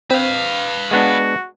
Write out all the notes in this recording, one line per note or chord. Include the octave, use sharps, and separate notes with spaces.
C4 B4 F5
G#3 B3 D4 F#4